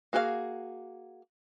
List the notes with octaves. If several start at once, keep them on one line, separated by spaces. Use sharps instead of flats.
A#3 F#4 G#4 A4 F5